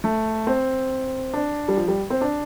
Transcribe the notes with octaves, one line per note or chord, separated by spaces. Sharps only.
A3
C4
D4
G3
F3
G3
C4
D4